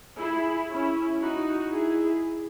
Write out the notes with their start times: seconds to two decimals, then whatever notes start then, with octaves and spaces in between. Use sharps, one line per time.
0.18 E4 G#4
0.69 C#4 E4
1.20 D#4 F#4
1.71 E4 G#4